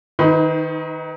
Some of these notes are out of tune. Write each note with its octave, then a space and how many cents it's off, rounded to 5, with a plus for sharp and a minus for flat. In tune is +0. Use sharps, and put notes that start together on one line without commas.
D#3 +0 D#4 +30 B4 +25